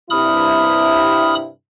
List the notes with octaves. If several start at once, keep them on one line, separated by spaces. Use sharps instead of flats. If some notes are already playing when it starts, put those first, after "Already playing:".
G2 C3 E4 B5 D#6 F6